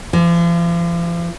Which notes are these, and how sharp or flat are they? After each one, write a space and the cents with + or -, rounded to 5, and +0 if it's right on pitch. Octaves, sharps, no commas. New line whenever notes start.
F3 -40